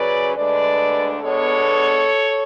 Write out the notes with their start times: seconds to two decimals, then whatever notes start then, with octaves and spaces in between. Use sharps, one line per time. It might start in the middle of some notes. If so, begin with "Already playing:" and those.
Already playing: C#3 F#3 C#4 B4 D5
0.35 D2 D3 G#3 D4 B4 D5
1.21 B2 G#3 B3 D4 A4 C#5